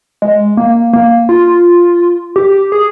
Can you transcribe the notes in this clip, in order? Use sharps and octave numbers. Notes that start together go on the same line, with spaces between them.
G#3
A#3
A#3
F4
G4
G#4